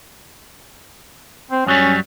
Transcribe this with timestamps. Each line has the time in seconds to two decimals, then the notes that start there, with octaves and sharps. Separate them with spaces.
1.51 C4
1.67 F#2 F#3 G3 C#4